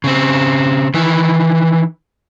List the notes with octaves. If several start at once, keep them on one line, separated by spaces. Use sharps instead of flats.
C#3 C4
D#3 E3